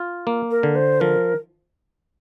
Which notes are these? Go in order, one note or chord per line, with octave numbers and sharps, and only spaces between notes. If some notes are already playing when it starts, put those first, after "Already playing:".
Already playing: F4
A#3
A#4
D3
C5
F3 A#4